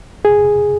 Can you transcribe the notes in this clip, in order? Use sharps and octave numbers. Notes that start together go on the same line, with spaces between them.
G#4